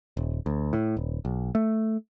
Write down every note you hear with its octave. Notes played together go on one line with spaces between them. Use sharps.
D#1
D2
A2
D#1
B1
A3